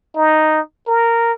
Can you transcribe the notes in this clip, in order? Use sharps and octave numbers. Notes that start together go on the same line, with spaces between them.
D#4
A#4